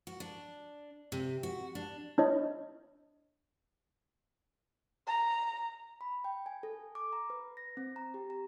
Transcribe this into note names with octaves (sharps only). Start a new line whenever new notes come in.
F#4
D4
C3
F#4
D4
D4 E4 C#5 D#5
A#5
B5
G5
G#5
A4
D6
A#5
B4
A#6
C4
A#5
G4
A#5